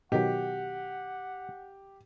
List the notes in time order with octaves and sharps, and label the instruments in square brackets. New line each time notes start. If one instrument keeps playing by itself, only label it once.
[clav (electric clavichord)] B2 D#3 F#3 [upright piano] G4 [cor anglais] F#5